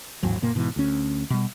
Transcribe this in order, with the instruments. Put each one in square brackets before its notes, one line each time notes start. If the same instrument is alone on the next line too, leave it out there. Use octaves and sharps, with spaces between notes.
[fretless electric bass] A1 D#2 G#2 F#3
F#1 A#2 A#3
G#2 B2 E3
D2 C#4
B2 G3